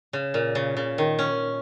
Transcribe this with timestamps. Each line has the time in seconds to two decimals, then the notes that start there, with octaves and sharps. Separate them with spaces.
0.13 C#3
0.34 A#2
0.55 C#3
0.77 C#3
0.98 D#3
1.19 C#4